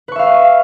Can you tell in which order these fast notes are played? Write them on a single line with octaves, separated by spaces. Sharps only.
B4 C#6 E5 F5